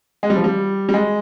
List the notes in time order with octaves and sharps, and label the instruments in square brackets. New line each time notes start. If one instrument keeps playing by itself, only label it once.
[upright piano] G#3
G3
F3
G3
G3
G#3